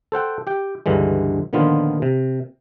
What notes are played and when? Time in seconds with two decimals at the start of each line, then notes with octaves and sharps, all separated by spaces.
0.12 A4 C5 F#5 G5
0.47 G4 G5
0.86 C#2 G2 D3 E3 G#3
1.53 A#2 D3 D#3 F3 B3 F4
2.02 C3